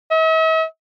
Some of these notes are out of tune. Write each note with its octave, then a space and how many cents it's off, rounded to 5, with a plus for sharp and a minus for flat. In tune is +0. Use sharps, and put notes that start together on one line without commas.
E5 -45